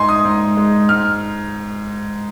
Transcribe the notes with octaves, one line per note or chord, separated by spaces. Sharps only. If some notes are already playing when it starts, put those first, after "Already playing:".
Already playing: G#2 D#4 G#5 C6
D#6
G#2
G#3
G#2 F6